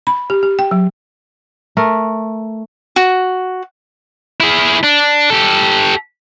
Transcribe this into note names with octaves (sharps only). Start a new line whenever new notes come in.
B5
G4
G4
G5
F#3
A3 A#4
F#4
E4 G#4
D4
G4 A4